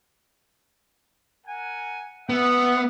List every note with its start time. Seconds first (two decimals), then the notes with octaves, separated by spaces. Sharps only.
1.47 A#4 F#5 G#5
2.29 B3 E5 F#5